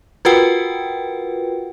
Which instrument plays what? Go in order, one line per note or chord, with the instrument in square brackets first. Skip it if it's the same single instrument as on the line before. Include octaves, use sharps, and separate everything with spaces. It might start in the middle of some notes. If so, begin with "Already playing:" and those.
[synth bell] F4 F#4 A#4 B4 F#5 G5